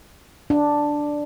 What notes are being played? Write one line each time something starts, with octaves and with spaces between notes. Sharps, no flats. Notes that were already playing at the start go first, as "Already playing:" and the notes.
D4